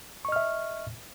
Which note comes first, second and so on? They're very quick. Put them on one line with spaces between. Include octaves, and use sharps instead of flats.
C#6 D#5 F6 E5